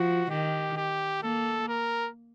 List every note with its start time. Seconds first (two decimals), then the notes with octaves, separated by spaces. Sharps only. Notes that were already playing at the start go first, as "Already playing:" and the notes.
Already playing: F3 F#4
0.30 D#3 G4
0.77 G4
1.21 A#3 A4
1.68 A#4